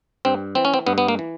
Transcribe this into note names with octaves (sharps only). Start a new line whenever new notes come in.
G2 C4
E3 C4
C#4
C4
G2 B3
B3
A#3
E3